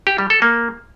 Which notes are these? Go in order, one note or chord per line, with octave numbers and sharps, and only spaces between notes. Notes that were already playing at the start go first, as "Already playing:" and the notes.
G4
G3
A4
A#3